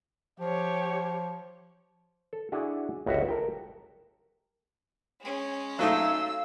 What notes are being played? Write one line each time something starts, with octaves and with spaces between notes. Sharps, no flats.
F3 G4 C#5
A4
D4 E4 F#4 G#4
G1 C#2 F#4 E5
A4 A#4 G5
G#3 C#4
F#3 A3 D#4 F5 E6